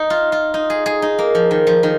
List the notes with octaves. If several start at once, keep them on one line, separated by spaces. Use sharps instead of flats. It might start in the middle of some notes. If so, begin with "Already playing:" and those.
Already playing: D#4
F4
F4
D#4
G#4
G#4
D#4
A#3
F3
D#3
F3
D#3